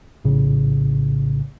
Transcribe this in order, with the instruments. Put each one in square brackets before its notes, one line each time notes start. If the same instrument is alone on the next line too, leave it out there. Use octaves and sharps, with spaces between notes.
[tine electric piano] A#1 A2 C#3